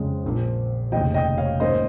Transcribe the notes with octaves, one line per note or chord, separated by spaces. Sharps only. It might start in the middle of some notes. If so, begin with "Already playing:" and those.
Already playing: F2 C#3 G#3 C#4
A#1 A#2 F3
F1 D#2 C#3 D#5 G5
D#5 G5
C#5 F5
G#2 D#3 A#3 C#4 C5 D#5